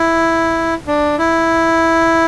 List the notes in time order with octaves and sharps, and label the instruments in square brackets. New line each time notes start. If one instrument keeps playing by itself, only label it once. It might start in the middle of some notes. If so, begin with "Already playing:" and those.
Already playing: [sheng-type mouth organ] E4
D4
E4